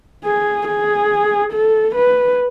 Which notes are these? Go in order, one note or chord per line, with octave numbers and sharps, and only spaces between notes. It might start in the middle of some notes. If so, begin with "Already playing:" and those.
G#4
G#4
A4
B4